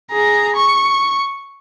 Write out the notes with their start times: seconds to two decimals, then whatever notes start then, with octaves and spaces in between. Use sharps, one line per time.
0.12 G#4 A#5
0.56 C#6